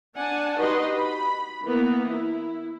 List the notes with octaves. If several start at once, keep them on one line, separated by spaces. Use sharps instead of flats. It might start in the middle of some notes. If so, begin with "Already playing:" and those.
D4 F#5 G#5 A5
D#4 F#4 G4 B4 D#5 C6
B5
E3 A#3 B3 A#4
E4